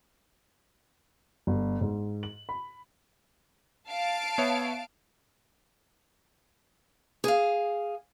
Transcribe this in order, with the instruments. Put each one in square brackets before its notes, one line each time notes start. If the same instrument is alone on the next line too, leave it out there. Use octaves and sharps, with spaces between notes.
[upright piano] G1
G#2
F#7
B5
[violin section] F5 A5 D7
[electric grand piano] B3 C#5 E5
[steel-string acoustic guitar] G#4 F5